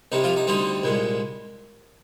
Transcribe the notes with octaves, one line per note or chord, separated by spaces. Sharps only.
C2 C3 G3 D#4
F3 F4
D#4
D2 D3 G3 C4 D#4
C2 A#2 G#3